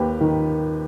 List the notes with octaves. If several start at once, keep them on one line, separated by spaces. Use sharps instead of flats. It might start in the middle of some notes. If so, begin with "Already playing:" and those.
Already playing: D#2 G4 B4
D#3